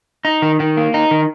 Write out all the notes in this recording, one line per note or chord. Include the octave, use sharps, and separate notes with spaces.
D#4
D#3
D#3
A#3
D#4
D#3